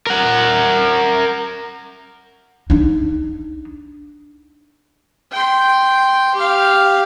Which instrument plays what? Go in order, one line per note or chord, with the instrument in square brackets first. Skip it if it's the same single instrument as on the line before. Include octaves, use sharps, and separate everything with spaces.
[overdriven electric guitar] A#4 F#5
[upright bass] D4 D#4
[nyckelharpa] G5 C6
G4 F5